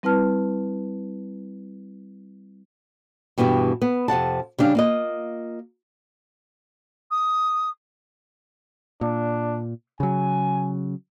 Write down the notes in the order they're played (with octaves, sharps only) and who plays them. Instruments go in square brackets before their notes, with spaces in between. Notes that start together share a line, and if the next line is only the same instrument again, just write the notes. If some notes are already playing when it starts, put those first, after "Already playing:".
[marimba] G3 C4 E4 B4 A5 F6
[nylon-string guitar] G2 B2 E3 B3 G4
B3
F2 C3 F#5 A5
C#3 G3 D4 F5
A#3 F4 D#5
[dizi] D#6
[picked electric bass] A#2 [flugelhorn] D4
[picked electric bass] C#3 F#3 [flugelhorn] G#5